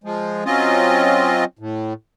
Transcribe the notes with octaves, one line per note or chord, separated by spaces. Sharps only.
F3 G#3
F#3 C4 C#4 F4 D#5
A2